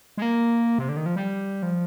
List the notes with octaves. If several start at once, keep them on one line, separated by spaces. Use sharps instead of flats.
G#3
A#3
C3
D3
D#3
F3
G3
F3